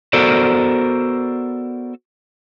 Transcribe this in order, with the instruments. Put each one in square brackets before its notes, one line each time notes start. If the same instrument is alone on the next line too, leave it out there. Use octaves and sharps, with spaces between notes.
[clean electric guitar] B3 F#4 A4 A#4 C5 D5